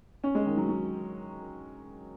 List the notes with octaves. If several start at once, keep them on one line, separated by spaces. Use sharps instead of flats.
C#4
G#3
D#3
F#3
F#3